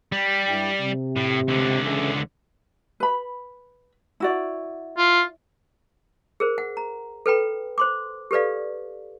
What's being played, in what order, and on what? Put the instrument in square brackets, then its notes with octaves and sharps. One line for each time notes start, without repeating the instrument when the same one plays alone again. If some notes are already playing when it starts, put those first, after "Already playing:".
[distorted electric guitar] G3
[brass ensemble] G2 E4 G5
C3
[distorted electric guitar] A2
C#2 D3
[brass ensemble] C#3 E3 A4
[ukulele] B4 B5
E4 F#4 D5
[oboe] F4
[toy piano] G#4 A#4 C5
F#5
A#5
A4 B4 G5 B5
C5 C6 D6
G4 A4 B4 D5 F5